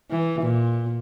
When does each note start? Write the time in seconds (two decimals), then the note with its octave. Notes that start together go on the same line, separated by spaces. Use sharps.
0.10 E3
0.42 A#2